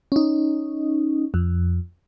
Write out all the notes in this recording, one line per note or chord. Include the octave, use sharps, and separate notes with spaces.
C#4 D#4
F2